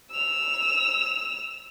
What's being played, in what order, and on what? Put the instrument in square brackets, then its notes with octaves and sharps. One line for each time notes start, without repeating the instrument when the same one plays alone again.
[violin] E6 F7